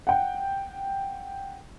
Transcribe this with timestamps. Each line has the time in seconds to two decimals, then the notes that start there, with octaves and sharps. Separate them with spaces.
0.07 F#5 G5